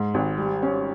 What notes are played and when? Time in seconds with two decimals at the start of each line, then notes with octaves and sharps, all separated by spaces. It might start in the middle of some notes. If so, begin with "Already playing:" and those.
Already playing: G#2
0.14 G#1
0.38 G3
0.62 C#4